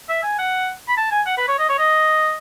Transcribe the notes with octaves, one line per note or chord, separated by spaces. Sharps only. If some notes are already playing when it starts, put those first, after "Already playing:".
E5
G#5
F#5
B5
A5
G#5
F#5
B4
C#5
D#5
C#5
D#5